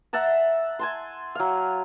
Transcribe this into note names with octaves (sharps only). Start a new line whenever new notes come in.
E5 F#5 A5 A#5
G#5 A5 C6
F#3 F5